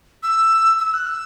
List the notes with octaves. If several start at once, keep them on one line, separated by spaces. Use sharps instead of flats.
E6
E6
F#6
E6